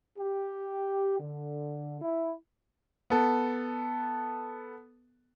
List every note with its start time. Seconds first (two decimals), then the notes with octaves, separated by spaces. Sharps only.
0.18 G4
1.20 D3
2.02 E4
3.10 B3 A4